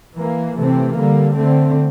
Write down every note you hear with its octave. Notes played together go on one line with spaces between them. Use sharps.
E3 A#3
C3 E3 A3 C4
D3 G3 A#3
D3 A3 C4